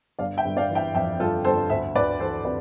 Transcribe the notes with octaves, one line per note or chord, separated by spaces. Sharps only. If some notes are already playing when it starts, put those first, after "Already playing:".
G1 D5 F5
E5 G5
G1
D5 F5
E3
E5 G5
F2 E5 G5
G1 F4 A4
G1 A4 C5
D2 C5 E5
D2 B4 D5
E3 A4 C5
C3 B4 D5